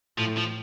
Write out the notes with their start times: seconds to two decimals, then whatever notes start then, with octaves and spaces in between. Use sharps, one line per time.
0.18 A2 F3
0.37 F3